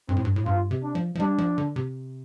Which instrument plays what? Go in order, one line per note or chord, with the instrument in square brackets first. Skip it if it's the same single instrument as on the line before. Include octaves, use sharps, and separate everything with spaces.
[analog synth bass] G2 [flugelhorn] C4
[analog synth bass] A2
G2
A2
[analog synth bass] G2 [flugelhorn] F4
[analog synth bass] C3
[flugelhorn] D4
[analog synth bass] F3
F3
[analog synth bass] G3 [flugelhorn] D4
[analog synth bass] F3
D3
C3